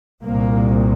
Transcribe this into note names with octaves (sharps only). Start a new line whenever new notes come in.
C2 A#2 A#3